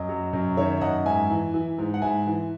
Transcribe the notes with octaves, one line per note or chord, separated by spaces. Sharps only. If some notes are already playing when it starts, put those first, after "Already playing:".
Already playing: F#2 D#5
F#3
F#2
D#3 C#5 E5
E5
F#2 D#5 F#5
G#2 E5 G#5
E3
E3
G#2
F#5
G#2 E5 G#5
E3